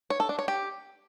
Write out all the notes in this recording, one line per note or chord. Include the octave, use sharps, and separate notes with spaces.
C#5
A4
D4
C#5
G4